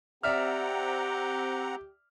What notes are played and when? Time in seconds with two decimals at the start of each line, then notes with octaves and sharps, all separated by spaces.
0.23 C4 G4 D5 E5 F#5 A#5 F6